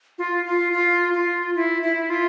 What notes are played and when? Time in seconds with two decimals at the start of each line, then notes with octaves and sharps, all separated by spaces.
0.18 F4
0.46 F4
0.73 F4
1.14 F4
1.55 E4
1.82 E4
2.10 F4